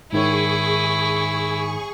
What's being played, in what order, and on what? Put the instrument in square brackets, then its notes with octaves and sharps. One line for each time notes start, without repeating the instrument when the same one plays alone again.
[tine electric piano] G#2 D#3 C#5 [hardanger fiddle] E4 [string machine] G#4 C#6